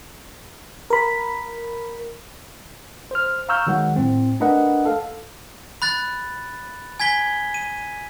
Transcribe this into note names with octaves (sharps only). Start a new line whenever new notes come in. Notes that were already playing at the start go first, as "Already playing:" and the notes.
A#4 B5
C5 F6
F5 A#5 C#6 E6 F6 G6
D#3 F#3 G#3 F#5
A2 C4
A3 D4 A#4 B4 D#5 F#5
A4 F5
B5 F#6 A6
G#5 G#6 B6 G7
D#7